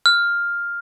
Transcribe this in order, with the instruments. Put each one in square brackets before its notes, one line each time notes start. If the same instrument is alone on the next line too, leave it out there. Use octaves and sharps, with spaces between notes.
[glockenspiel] F6